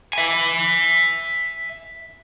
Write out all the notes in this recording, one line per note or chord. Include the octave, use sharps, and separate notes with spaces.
E5 G#5